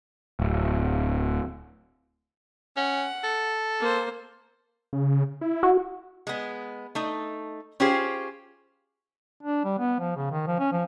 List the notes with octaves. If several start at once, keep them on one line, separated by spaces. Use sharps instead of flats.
D1
C#4 F#5
A4
A#3 C5
C#3
E4
F#4
G#3 B3
A3 D#4
C#4 F4 G4 G#4 C5
D4
G3
B3
F3
C#3
D#3
F3
C#4
F3